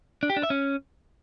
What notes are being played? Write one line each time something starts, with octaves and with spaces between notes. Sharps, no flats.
D4
G4
D4
E5
C#4